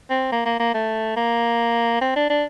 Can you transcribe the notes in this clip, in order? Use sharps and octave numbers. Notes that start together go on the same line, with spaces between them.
C4
A#3
A#3
A#3
A3
A#3
C4
D4
D4